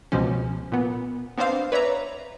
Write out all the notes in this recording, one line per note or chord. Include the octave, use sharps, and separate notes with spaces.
C#2 B2 F3 C#4
A#2 B3
B3 C4 D4 C5 F5
B4 C#5 D5 E5 A#5